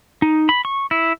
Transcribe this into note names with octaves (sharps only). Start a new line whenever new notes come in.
D#4
B5
C#6
E4